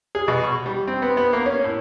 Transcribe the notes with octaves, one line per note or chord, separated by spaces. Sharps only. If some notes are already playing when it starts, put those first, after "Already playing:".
G#4
B2
C#6
G3
C4
B3
B3
A#3
C#4
A2